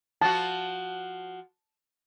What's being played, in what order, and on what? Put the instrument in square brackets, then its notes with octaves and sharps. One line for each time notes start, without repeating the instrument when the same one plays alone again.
[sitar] F3 F#4 [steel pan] A5